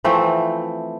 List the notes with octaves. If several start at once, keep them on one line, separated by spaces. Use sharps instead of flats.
E3 F3 A3 C4